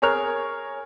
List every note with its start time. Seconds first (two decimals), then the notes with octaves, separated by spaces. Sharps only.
0.02 G#4 A#4 C#5 A#5 F6